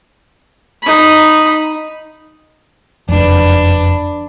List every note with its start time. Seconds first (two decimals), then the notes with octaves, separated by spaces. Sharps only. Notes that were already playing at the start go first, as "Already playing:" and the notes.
0.82 D#4 B5
3.09 F#1 F2 D4 B4